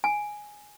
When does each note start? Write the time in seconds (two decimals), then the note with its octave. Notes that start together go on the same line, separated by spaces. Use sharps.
0.04 G#5